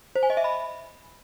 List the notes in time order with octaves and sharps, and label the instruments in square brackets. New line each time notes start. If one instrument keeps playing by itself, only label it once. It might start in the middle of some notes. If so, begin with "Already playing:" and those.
[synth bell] C5
G#5
D#5
E5
B5